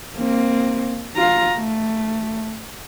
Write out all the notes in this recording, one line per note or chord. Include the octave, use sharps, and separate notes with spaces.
A#3 C4
F4 A#5
A3